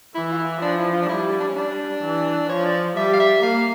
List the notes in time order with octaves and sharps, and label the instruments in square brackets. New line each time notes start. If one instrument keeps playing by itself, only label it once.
[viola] E3 [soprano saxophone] E4
[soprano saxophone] F4
E4
[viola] F3 [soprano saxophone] D4
[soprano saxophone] E4
F4
D4
[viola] G3 [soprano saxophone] E4
[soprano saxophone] E4
D4
C#4
[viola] G3 [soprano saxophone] D4
[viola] E3
[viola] F3 [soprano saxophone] C#5
[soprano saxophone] D5
[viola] G3 [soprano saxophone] E5
[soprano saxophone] F5
E5
[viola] A#3 [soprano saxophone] F5